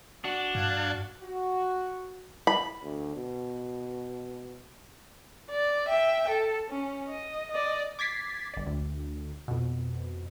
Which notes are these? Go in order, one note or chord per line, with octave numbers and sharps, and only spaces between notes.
D4 F#4
G2 F5 F#6 G#6
F#4
B5
D2
B2
D5
E5 G5
A4
C#4
D#5
D5 D#5
D6 G#6 A6 B6 C7
G1 D5
D2
F2 B2